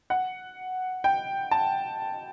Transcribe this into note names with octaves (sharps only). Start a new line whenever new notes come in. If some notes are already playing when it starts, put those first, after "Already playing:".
F#5
G5
A5